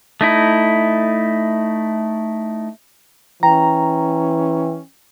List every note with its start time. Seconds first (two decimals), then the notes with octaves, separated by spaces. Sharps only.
0.21 A3 D#4 E4
3.43 E3 C#4 G5 A#5